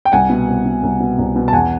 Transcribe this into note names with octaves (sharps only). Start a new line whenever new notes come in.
G5
C2 F#5 G#5
B2
C2
B2
C2
B2
C2
B2
A5
E2 F#5 G#5